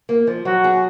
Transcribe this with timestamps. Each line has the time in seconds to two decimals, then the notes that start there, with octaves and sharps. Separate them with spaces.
0.09 A#3
0.27 F3
0.45 F#3 F#4
0.64 G#4